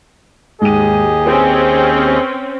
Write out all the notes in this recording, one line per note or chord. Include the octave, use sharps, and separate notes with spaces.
D#2 G#2 G4 G#4 D#5 D#7
C4 C#4 B4 G#5